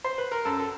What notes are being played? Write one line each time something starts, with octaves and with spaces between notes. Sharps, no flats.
C5
B4
A#4
F#2 A4
A4